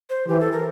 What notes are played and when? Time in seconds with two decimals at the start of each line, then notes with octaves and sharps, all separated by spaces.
0.10 C5
0.28 E3 G4
0.40 A4
0.52 A#4